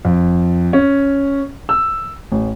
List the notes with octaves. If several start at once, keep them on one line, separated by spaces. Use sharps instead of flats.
F2
C#4
E6
A1